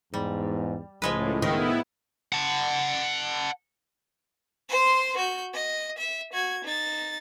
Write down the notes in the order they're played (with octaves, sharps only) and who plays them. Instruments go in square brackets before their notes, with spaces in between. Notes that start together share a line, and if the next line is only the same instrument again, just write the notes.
[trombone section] E2 G#2 [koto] G3
[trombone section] C#2 [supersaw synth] A2 [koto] F3 G#3 B4
[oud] D#3 [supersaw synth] B3 E4
[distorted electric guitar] F#5 A5
[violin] C5 C6
F#4 G6
D#5
E5
F#4 G#6
D#4 A6